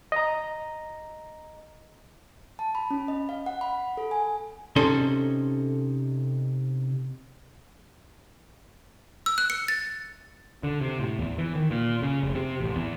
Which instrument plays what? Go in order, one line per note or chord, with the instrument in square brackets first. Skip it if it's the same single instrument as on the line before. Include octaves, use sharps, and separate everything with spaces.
[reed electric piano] D#5 A#5
[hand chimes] A5
B5
C#4
D#5
F5
F#5
B5
A4
G#5
[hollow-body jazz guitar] C3 C#4 D#4 A4 C6
[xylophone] E6
F#6
C#7
A6
[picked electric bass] D3
C3
A2
E2
E3
D#3
A#2
C#3
F1
C3
A1
E2